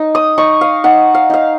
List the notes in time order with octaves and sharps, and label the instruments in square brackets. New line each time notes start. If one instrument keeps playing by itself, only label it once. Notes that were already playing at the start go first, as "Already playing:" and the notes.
Already playing: [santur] D#4
D#6
D#4 C#6
F5
D#4 F#5
F5
D#4 F5